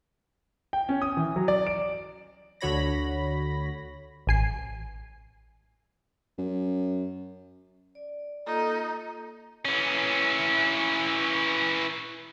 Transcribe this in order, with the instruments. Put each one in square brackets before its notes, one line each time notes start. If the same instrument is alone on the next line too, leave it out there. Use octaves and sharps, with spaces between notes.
[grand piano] G5
C#4
D#6
E3
F#3
D5
D7
[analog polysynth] D2 D3 F#4 C#5 B5 A#6
[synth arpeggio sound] A1 G#5 C7
[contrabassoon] F#2
[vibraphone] D5
[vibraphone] A#3 F4 A4 [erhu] D#4
[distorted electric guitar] E3 C#4